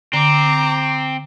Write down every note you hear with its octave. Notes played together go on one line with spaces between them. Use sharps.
D3 C4 A#5 D6